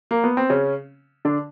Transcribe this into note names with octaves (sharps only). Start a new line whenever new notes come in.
A#3
B3
C4
C#3 C#4
D3 D4